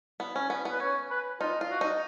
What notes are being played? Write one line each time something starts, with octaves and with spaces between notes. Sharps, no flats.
B3
C#4
B3
B3
B4
C#4 C#5
B4
D#4 F4
F4
F#4
D#4